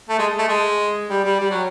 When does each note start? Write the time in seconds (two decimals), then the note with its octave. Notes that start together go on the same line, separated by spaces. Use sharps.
0.09 A3
0.19 G#3
0.38 A3
0.48 G#3
1.10 G3
1.25 G3
1.40 G3
1.51 F#3